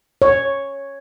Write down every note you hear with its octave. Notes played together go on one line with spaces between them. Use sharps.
C#5